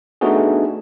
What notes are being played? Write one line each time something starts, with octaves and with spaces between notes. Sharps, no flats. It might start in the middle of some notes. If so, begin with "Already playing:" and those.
A3 B3 D4 D#4 F#4 G#4